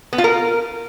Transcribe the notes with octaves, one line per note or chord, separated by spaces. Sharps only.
B3
F4
A#4